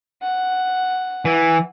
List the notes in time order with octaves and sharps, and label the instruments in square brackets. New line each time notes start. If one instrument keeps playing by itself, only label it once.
[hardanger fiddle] F#5
[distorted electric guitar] E3